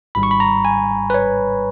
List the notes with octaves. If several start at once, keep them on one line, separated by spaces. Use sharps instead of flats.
G#1 G#2 G3 B5
C#6
B5
A#5
G#5
B4
C#5